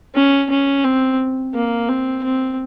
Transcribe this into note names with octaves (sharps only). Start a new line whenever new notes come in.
C#4
C#4
C4
A#3
C4
C4